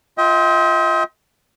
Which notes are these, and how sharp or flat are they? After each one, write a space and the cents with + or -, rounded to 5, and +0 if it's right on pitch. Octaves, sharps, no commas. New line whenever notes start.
F4 +0 D#5 +45 G5 +0